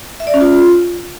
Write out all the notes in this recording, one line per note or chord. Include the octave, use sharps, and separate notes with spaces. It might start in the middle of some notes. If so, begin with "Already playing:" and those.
E5
D5
C#4
F4